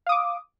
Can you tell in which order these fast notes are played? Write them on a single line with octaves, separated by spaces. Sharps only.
F5 D#6 D6